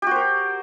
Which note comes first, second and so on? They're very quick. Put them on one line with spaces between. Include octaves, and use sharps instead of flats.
G4 F#4 C5 A#4